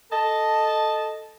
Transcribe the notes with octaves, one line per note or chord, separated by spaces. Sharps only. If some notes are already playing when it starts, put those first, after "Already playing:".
A4 D#5 A5